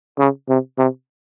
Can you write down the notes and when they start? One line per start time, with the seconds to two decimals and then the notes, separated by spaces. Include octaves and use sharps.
0.19 C#3
0.49 C3
0.78 C3